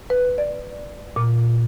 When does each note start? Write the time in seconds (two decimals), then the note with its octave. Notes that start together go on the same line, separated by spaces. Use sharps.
0.10 B4
0.38 D5
1.16 A#2